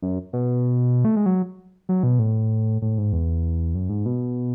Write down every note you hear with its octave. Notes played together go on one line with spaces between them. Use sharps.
F#2
B2
A3
G#3
F#3
F#3
B2
A2
A2
G#2
E2
F#2
G#2
B2